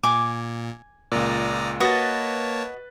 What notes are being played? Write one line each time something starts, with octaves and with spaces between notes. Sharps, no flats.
A#2 G#5 D6
C#2 A#2 D5 A#5 D#6
A#3 F#4 B4 C#5 D#5 A5 A6